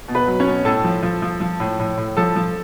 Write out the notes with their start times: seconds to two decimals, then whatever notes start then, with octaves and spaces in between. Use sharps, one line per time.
0.08 B2
0.15 B4 B5
0.27 F#3
0.40 C#4 C#5
0.46 B2
0.65 A2 A4 A5
0.84 F3
1.03 F3
1.22 F3
1.41 F3
1.60 A2
1.79 A2
1.97 A2
2.17 F3 A4 A5
2.36 F3